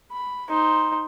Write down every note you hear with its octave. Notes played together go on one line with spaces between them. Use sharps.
B5
D#4 C5